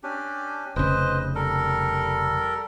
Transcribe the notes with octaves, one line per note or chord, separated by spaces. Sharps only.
C#4 D4 G4
F1 C#3 B4 C5 D#5
G3 A4 A#4